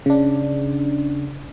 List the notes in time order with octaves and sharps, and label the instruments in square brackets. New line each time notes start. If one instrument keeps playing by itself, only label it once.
[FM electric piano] C#3 D4